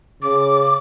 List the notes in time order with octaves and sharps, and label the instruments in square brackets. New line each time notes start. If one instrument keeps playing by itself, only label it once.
[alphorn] C#3 [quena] D6